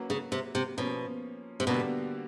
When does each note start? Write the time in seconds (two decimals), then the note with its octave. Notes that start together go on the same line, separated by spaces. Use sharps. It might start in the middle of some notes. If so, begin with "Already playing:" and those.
Already playing: F#3 A#3 C#4 F#4 B4
0.10 C#3
0.32 C3
0.55 C3
0.77 B2 F3 A#3 C#4
1.60 C3
1.67 B2 D3 G3 A#3 D4 F#4